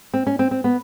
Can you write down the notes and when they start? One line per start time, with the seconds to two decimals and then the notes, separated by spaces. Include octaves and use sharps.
0.14 C4
0.27 C#4
0.39 C4
0.51 C4
0.64 B3